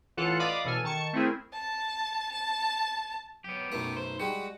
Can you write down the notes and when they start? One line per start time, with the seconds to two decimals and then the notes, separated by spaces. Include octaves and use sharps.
0.17 A1 E3 F4 A4 F#5 F#6
0.39 D5 D#5 F5 B5 D6 D#6
0.64 A1 B2 A4 G#5 F6
0.84 D#3 A5 C#6 C#7
1.13 A3 C4 E4 G#4 A#4
1.53 A5
2.32 A5
3.44 F#3 B3 G4
3.72 B1 F#2 A3 D#4
3.97 C5
4.20 G3 G#3 F#4